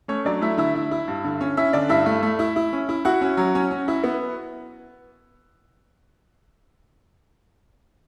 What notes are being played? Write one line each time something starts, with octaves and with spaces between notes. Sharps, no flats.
A3 C#4 C#5
F#3 D4 D5
A3 E4 E5
D3 E4 E5
E4
E4
G2
D3
C#4
C#4 E4 E5
D3 D4 D5
G2 E4 E5
A3
A3
E4
E4
C#4
E4
E4 F#4 F#5
C#4
F#3
C#4
C#4
E4
B3